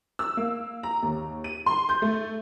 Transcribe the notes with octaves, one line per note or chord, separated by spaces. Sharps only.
E6
A#3
A#5
D#2
D#7
C6
G6
A3